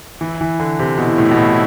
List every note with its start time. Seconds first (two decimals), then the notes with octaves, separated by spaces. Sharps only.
0.21 E3 E4
0.41 E3
0.59 D3
0.79 C3
0.98 B2 E4
1.18 A2
1.31 B2
1.37 A2